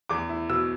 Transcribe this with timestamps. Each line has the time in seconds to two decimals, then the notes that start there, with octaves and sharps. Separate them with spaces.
0.09 E2 D6
0.29 E4
0.50 B2 E6